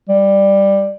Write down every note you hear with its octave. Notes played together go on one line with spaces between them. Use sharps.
G3